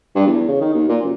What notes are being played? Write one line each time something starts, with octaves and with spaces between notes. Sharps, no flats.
G2
E2
C#3
D#3
D#2
A#2
F#1